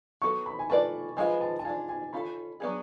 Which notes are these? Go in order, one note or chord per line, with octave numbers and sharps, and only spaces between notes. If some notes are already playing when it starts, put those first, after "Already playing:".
F#3 B3 F#4 A4 C#6
B5
G#5
A3 F4 B4 D5 A5
F3 G#3 C#4 F4 B4 G#5
A5
A5
G#3 D4 F4 G#5
G#5
C#4 F4 A4 B5
F#3 B3 D4 G#4